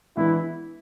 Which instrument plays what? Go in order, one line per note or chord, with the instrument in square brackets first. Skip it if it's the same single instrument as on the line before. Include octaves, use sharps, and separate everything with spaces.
[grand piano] E3 G#3 B3 D4 [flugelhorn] E4